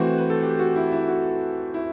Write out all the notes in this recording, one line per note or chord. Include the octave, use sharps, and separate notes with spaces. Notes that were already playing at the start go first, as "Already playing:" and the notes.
Already playing: E3 A3 C4 F#4
B4
A4
G4
F#4
E4
E4
F#4
E4